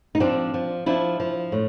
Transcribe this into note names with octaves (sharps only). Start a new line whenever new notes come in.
D#4
F3 C4 D4
F3
F3 D4 E4
F3
A2